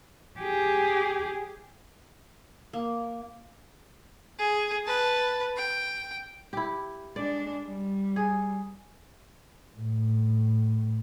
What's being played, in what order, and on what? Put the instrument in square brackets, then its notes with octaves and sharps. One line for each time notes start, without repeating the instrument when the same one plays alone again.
[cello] G4 G#4
[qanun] A#3
[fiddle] G#4
B4 A5
G5
[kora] E4 G4
[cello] G#3 D4 [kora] D5
[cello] G3
[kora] G#4
[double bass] A2